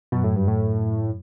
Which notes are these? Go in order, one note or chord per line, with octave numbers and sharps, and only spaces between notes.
F#2 B2 F#3
A2
G2
A2